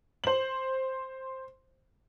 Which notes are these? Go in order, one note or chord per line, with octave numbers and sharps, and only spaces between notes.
C5 F#7